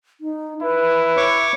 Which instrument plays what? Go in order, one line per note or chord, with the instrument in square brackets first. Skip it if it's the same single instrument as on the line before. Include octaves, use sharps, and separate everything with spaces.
[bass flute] D#4
[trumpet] E4 [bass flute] B4
[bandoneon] C#5 C#6 D6